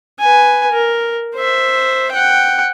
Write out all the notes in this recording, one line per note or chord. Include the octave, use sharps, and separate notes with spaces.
B4 G#5
A#4
C5 E5
F#5 G5